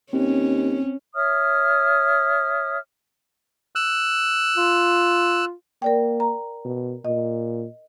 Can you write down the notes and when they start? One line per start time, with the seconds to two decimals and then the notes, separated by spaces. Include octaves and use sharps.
0.13 D#2 C4 C#4
1.14 C#5 E5 D#6 F6
3.75 E6 F#6
4.57 F4
5.82 A#3 A#4 D5 G5
6.20 A#5
6.65 B2
7.05 A#2 D#5